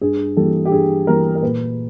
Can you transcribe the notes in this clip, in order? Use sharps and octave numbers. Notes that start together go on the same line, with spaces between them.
G2 G#4
E3 G3 A#3 A4
G4
G2 G#4
E3 G3 A#3 A#4
A#4
A#2 B4